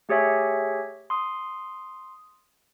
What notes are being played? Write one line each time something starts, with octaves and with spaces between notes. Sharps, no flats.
A3 G4 G#4 C#5 E5 G#5
C6 D#6